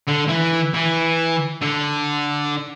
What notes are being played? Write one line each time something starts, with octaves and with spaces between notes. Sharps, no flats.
D3
E3
E3
D3